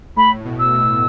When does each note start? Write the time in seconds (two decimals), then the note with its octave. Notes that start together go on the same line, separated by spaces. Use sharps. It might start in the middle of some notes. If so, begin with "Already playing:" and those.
0.16 A2 B5
0.45 B2
0.59 E6
0.73 B2